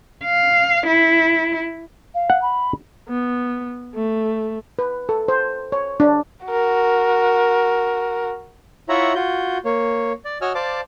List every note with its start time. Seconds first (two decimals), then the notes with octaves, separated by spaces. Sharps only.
0.25 F5
0.87 E4
2.14 F5
2.30 F#5
2.42 B5
3.09 B3
3.94 A3
4.79 B4
5.09 A4
5.28 C5
5.72 C#5
6.00 D4
6.46 F#4 A#4
8.89 E4 F4 C#5 E5 F#5 A#5
9.15 F4 F#4 G6
9.65 A#3 C#5
10.25 D5
10.41 F#4 C#5 D#5 G#5 E6 F6
10.55 C5 D5 F5 A5 D6